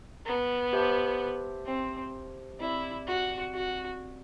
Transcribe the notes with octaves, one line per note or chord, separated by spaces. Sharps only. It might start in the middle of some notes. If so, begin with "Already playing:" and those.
B3
G4 C5 E5 A5
C4
C4 E4 G4 D5
F#4
F#4